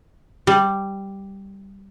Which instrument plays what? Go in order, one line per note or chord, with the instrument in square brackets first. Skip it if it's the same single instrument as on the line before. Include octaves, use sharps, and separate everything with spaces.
[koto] G3